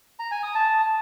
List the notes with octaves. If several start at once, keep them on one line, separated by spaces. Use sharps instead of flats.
A#5
G#5
D#6
A5